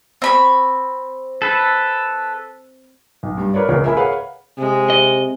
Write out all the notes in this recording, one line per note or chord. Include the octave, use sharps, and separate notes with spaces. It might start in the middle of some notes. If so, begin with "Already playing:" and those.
C4 B5 C#6
A4 B4
B1
G2
F4 A#4 B4 C#5 D5
E1 C#2 A#2 C#3 F3 A#4
A#4 E5 G#5 B5
G#4 A#4 B4 C#5 F5 F#5
C3 G#3
D#5